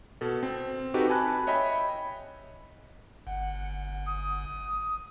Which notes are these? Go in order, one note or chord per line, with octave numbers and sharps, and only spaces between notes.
B2 A4
C4
D#4 F#4 G4 A4 B4
G#5 A5 B5 F#6
C#5 D#5 E5 G5 B5
G1 F#5
D#6